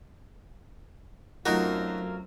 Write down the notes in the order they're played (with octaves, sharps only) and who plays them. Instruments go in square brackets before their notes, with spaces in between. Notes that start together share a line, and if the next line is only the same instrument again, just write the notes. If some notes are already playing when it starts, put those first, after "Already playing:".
[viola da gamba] F#2 C4 [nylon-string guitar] F#3 A3 F4 [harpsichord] D#4 F#4 [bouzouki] A#4